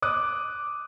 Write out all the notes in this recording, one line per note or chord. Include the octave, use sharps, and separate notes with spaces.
D6 D#6 F#6 D#7